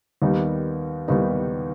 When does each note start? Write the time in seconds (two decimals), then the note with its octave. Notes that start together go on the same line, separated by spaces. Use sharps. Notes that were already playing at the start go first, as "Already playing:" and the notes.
0.22 D#2 D#3 G3 B3 D#4
1.08 D#2 D#3 G3 B3 D#4